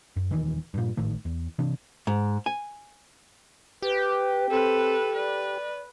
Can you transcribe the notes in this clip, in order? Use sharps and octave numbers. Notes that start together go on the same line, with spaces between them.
F#2
D#1 D#3 E3
G2 A#2
G#1 A2 D#3 A3
E2
C3 E3 D4
G#2
G#5
G4 B4
C4 A4 B4
B4 D5